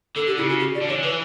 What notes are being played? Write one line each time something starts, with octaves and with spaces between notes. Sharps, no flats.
D3 A4
G4
C#3 E4
F#4
G4
D5
D3
E3 C#5
D3
E3 B4